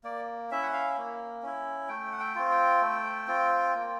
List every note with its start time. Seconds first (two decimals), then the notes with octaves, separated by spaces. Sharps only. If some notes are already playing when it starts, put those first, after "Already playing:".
0.04 A#3 D5
0.51 C#4 E4 E5
0.63 F#5
0.73 F5
0.98 A#3
1.43 C#4 E4
1.89 A3 G5
2.13 F#5
2.20 G5
2.35 C4 F4
2.51 G5
2.81 A3
3.28 C4 F4
3.75 A#3